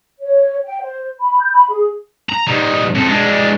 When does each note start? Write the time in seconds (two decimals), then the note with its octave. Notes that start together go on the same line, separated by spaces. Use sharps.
0.20 C#5
0.64 G5
0.81 C5
1.18 B5
1.40 G6
1.52 B5
1.69 G#4
2.30 A#5
2.47 G3 D#4
2.94 F2 A4
3.08 G#3 D4